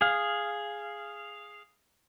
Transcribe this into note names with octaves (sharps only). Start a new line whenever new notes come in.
G#4 F5